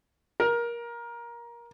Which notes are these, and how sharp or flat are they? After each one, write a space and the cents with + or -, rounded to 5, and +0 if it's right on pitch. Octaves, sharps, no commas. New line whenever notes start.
A#4 +20